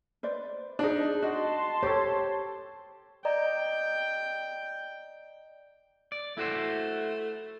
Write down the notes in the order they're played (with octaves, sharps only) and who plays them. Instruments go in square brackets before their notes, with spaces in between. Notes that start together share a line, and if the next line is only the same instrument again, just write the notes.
[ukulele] B4 C5 D5
[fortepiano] D4 D#4 [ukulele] G#4 A5
[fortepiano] F#4 [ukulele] D#5 [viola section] A5 C6
[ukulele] G4 [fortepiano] A4 C5 [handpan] C#5
[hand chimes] D5 D#5 A#5 [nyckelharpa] G5
[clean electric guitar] D5
[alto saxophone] A3 [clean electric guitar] E4 F#4 C5